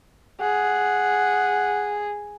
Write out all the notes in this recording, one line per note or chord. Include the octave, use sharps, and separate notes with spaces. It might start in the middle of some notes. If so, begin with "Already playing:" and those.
G#4 F#5